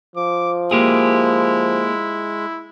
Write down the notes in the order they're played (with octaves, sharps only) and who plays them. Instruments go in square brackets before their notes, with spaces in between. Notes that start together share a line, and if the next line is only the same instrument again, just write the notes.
[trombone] F3 [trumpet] D6
[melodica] G#3 [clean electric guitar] A#3 G4 G#4 [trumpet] E4